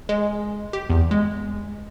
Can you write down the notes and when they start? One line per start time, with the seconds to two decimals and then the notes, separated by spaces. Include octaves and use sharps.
0.09 G#3
0.73 G4
0.90 E2
1.11 G#3